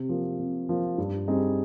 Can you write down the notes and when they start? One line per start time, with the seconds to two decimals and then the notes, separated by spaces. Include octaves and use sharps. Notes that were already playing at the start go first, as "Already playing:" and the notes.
Already playing: C3
0.09 F3 A#3 F4
0.39 C3
0.69 F3 A#3 F4
0.98 G2
1.28 G3 C4 D#4 G#4